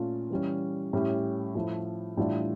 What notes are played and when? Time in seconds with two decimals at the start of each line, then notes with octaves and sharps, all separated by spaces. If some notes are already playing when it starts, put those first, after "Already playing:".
Already playing: A#2 A3 C#4 F4
0.30 E3 G3 C#4
0.93 A2 G3 C#4 E4 G4
1.55 A2 F3 A3 E4
2.17 A2 E3 G3 D4 F4